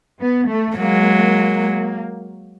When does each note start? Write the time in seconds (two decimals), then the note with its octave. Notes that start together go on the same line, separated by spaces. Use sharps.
0.21 B3
0.49 A3
0.77 F#3 G#3 A#3